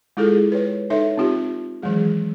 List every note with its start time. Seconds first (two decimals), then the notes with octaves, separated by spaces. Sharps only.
0.17 G#3 E4 F4 G#4 A4
0.52 B4 C#5
0.90 D#4 A4 C#5 E5
1.17 C4 D#4 F4 G4
1.82 D#3 E3 F#3 G#3 G#4